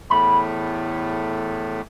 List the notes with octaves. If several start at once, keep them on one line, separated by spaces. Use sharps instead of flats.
E2 A2 A3 B5